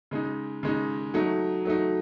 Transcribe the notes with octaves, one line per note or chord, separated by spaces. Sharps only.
C#3 G#3 D#4
C#3 G#3 D#4
F#3 A3 D#4
F#3 A3 D#4